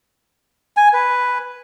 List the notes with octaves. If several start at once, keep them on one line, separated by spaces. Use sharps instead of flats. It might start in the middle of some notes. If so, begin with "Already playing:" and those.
G#5
B4